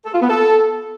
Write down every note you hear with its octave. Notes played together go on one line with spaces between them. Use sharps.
A4
F4
B3
A4